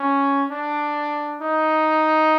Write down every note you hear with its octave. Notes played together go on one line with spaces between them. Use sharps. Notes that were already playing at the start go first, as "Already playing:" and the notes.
Already playing: C#4
D4
D#4